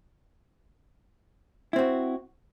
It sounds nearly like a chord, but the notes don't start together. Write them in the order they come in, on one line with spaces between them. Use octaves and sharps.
E4 C4 F#4